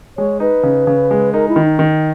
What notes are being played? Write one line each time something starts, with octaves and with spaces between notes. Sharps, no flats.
G#3 C#5
D#4 B4
C#3
C#3
G#3
D#4 A#4
E4
D#3
D#4
D#3